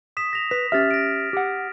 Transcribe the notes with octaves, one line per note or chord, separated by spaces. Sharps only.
D#6 B6 E7
A#6 F7
B4 B6
C#4 G4 E5 F6 A6
A#6 D7
G4 F#5